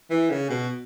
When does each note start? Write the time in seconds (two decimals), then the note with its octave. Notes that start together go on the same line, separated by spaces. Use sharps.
0.10 E3
0.30 C#3
0.49 B2